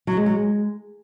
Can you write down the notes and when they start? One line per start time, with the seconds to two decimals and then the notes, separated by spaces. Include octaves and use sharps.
0.07 F#3
0.17 G#3
0.26 F#3
0.35 G#3